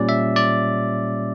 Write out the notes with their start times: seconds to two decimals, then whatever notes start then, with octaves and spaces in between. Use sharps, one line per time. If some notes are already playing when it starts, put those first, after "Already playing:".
Already playing: A#2 G3 C#4 D5
0.09 E5
0.36 D5